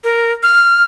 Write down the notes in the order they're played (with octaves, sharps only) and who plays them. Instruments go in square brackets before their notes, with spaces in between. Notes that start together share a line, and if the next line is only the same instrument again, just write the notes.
[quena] A#4
F6